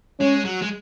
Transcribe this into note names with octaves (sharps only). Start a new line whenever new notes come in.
G#3 C#4
F#3
G#3